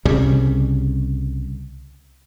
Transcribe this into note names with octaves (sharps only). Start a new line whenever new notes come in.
C2 C#3 G3